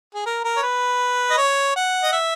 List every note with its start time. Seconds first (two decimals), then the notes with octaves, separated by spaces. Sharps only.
0.15 G#4
0.26 A#4
0.44 A#4
0.57 C#5
0.63 B4
1.30 D#5
1.37 C#5
1.76 F#5
2.03 D#5
2.13 E5